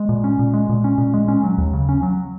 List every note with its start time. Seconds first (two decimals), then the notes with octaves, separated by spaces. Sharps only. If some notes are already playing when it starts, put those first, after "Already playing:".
Already playing: G#3
0.09 A#2
0.24 C#4
0.39 A#2
0.54 G#3
0.69 A#2
0.84 C#4
0.98 A#2
1.14 G#3
1.28 C#4
1.44 F#3
1.58 D#2
1.73 C#3
1.89 C#4
2.03 F#3